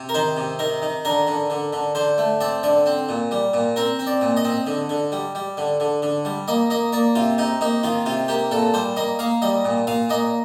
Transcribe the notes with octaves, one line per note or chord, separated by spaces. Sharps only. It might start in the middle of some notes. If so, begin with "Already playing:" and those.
Already playing: C3
A#4
D#3 C5
C3
D#3 A#4
D#3
D3 A#4
D3
D3
D3
D3 C5
A3
C4 D5
D3 D5
C4
A#2
G3
A#2
C4 A#4
C4
D5
A#2
D#5
C4
D3
D3
G3
G3
D3
D3
D3
G3
A#3 D#5
A#3 D#5
A#3 D5
C3 F4
C3 D#4
A#3 D#4
D#3 F4
C3 F4
A#3 G4
A#2 A4
G3 C5
A#3 D#5
A#3 F5
G3 D#5
A#2
A#2 F5
A#3 D#5